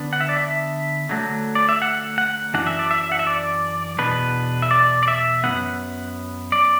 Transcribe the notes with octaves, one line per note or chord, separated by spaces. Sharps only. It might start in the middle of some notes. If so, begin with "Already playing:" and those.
Already playing: D3 B3 D4
F#5
E5
D5
E5
D3 F#3 A3
D5
E5
F#5
F#5
F#2 E3 D4 F#5
E5
D5
E5
F#5
E5
D5
E2 B2 B3 D4 B4
E5
D5
D5
E5
F#2 E3 B3 F#5
D5